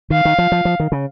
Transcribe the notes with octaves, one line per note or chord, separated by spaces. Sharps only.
D#3 F5
D#3
F3
F3
F3
D#3
C#3